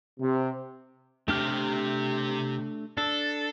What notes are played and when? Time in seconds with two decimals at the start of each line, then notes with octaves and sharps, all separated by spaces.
0.20 C3
1.28 C3 A3 D4 G4 F6
2.97 D4 A4